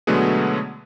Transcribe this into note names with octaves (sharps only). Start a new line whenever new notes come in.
B2 D3 F#3 G#3 A3 B3